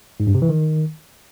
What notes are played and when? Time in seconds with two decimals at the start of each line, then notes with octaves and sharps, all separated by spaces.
0.20 G#2
0.27 G2
0.35 C3
0.42 E3
0.49 D#3